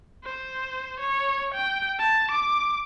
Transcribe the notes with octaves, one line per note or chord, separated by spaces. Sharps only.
C5
C#5
G5
A5
D6